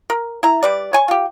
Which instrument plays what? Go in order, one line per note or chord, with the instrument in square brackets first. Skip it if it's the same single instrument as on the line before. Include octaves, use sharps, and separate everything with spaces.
[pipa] A#4
E4 A#5
G3 B4 D5
C#5 G#5 C#6
F4 G4